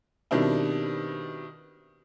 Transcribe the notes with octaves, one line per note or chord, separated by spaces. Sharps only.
B2 D#3 G3 C4 D4 E4